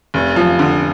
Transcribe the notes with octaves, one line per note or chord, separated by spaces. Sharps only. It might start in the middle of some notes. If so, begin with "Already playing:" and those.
F1
F3
D3